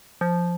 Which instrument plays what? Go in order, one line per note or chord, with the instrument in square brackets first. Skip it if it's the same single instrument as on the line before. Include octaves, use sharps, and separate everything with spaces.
[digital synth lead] F3